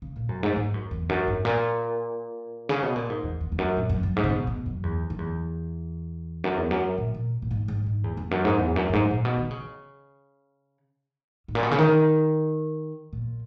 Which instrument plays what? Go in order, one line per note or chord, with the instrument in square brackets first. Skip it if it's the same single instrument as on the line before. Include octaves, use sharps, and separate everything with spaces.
[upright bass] C#3
A#2
F#2
G#2
G#2
F#2
E2
F#2
G#2
A#2
C#3
B2
A#2
G#2
E2
E2
E2
F#2
A#2
F#2
F#2
G#2
C#3
B2
B2
F#2
E2
F#2
E2
F#2
E2
F#2
A#2
A#2
A#2
G#2
G#2
G#2
E2
E2
F#2
G#2
E2
F#2
F#2
G#2
A#2
B2
D#3
C#3
G#2
A#2
B2
C#3
D#3
A#2